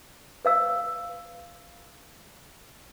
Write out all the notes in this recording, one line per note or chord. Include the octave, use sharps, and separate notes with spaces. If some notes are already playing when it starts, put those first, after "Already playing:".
B4 F5 E6